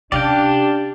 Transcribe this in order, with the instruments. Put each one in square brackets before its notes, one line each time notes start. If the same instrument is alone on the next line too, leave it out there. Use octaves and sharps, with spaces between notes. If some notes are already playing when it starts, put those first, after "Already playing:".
[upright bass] C3 C#4 [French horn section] D4 [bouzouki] G4 [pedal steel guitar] D5 F5 G5